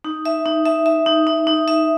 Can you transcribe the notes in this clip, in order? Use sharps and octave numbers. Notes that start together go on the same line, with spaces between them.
D#4
E5
D#4
E5
E5
D#4
D#4
D#4
E5